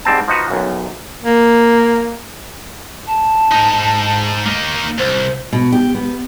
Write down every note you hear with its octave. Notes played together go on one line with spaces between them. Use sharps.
G#2 G3 C4 A5
F3 D#4 F#4 B4
B1 F#2
A#3
A5
G#2 D#4
A#3 D#4
C2 C5
B2
G4
B3